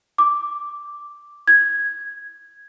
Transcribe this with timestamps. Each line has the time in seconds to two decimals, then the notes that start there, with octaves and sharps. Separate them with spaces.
0.18 D6
1.48 G#6